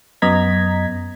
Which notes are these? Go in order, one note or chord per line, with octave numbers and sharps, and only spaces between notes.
F#2 B3 D#5 A#5 G#6 B6